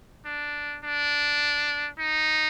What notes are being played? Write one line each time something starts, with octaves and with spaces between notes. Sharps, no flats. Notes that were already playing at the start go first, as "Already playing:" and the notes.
D4
D4
D#4